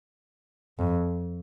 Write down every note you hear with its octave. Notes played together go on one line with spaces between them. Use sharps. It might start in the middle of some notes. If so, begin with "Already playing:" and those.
F2